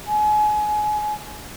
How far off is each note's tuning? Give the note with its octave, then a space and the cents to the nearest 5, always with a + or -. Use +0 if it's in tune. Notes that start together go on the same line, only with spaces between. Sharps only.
G#5 +30